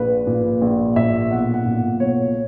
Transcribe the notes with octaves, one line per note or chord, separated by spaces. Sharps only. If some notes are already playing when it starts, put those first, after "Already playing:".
Already playing: A#1 B4
A#2
A#1
A#2 E5
B1 F#5
F#5
A#2
B1 C#5